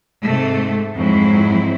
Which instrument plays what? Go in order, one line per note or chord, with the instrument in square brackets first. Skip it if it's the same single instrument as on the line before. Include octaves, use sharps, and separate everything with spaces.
[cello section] G#2 C3 A3
F2 G#2 F#3 C4 E4